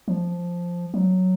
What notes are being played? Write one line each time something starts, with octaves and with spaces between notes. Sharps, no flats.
F3
F#3